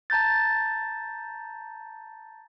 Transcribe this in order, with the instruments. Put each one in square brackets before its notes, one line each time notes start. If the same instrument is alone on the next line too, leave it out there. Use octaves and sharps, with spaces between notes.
[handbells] A5 A#5 G6 A6